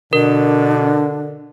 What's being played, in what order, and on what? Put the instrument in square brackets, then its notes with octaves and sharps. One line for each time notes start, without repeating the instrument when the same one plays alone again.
[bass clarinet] B2 [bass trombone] D3 [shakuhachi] D4 [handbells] A#4